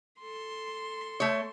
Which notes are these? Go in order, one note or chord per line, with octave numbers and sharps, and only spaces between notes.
A4 C6
A3 C#5